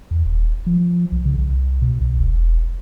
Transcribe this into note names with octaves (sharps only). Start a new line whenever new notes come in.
E2
D#1
F3
C2
C#3
C2
B2
C2
E1